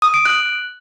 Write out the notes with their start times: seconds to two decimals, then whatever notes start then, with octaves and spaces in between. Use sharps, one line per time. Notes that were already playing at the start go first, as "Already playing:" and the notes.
0.02 D#6
0.14 D7
0.25 F#6